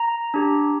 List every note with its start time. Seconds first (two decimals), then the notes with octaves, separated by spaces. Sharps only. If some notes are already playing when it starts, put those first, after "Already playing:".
Already playing: A#5
0.34 D4 G4